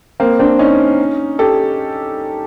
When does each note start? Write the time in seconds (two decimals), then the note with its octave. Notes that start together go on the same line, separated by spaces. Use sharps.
0.20 A#3 C4
0.39 C4 D4
0.59 C#4 D#4
1.39 G4 A4